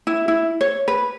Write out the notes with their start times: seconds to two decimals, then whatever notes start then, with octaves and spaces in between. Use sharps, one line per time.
0.07 E4
0.28 E4
0.61 C#5
0.88 B4